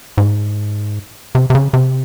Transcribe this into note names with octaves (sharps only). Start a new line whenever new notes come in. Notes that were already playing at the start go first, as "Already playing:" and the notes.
G#2
C3
C3
C#3
C3